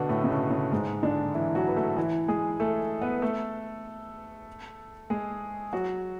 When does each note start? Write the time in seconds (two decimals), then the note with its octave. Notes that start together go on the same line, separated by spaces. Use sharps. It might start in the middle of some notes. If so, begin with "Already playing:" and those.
Already playing: B2 D3 B3 D4
0.09 A2 A3
0.24 C#3
0.30 B2
0.51 C#3
0.72 G#2 G#3
1.03 D3 D4
1.34 E3 E4
1.55 F#3 F#4
1.68 B4
1.76 A3 A4
1.97 E3 E4
2.28 G#3 G#4
2.60 A3 A4
3.02 B3 B4
3.22 A3 A4
5.10 G#3 G#4
5.73 F#3 F#4